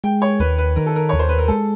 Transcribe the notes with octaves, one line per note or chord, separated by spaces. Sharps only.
G#3 G5
C#5
D#2 B4
B4
D#3 A#4
A4
A#4
D#2 C#5
C5
B4
A#4
G#3 A4